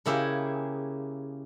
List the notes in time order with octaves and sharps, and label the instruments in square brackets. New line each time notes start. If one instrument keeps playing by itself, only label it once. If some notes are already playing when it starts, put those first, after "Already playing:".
[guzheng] C#3 A#3 E4 G4 G#4